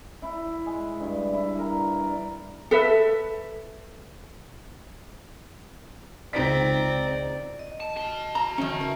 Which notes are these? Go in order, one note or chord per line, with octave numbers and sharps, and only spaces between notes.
E4
G#3
G2
E4
A#4
D5
A4 B4 E5
C#2 C4 D#4 D5 B6
D#5
A5
F#4 A5
A#5
D#3 C#4 E5
A#4